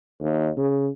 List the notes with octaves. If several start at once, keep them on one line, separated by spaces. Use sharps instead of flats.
D#2
C#3